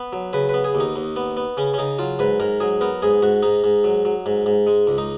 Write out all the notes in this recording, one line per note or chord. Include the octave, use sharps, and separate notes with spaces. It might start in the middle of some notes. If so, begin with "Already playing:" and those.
Already playing: B3 B4
F#3
C#3 B4
B3 B4
G#4
D#2
D#4
D#2
B3
B3
C#3 C#4
C#4
C#3 D#4
F#3 F4
G#2 B4
G#2 A#4
F#3 G#4
B3 A#4
G#2 G#4
G#2 F#4
G#2 D#4
G#2
F#3
F#3
G#2
G#2
G#3
C#2
D#4